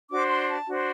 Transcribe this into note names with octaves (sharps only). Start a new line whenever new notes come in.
D4 F#4 C5 D6
C6
A5
D4 F#4 C5